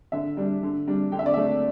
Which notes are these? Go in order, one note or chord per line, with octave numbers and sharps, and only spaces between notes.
D3 E5
G3 D4
D3
G3 D4
D3 G5
E5
D5
A3 D4 E5